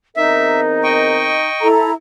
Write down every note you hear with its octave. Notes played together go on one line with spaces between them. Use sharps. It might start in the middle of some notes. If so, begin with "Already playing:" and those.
E2 C4 D#4 A#4 E5
D#5 G5 C#6
E4 A4 A#5